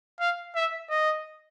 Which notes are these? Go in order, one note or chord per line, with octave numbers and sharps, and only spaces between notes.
F5
E5
D#5